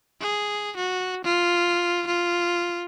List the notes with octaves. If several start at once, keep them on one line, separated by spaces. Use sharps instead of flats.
G#4
F#4
F4
F4